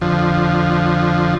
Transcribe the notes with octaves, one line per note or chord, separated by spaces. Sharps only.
F2 D3 F3